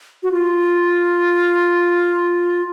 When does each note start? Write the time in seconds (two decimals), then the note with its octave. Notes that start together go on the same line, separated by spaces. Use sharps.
0.23 F#4
0.31 F4